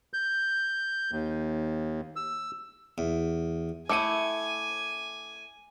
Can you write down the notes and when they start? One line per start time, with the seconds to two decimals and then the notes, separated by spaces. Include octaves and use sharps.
0.14 G6
1.12 D#2
2.16 E6
2.98 E2
3.89 A3 E4 G#5 D6 C#7 D#7